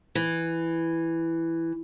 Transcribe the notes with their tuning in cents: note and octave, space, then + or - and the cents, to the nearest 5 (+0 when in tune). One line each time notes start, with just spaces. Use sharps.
E3 +5